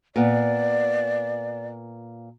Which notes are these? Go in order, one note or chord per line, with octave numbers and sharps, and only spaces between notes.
A#2 B3 D5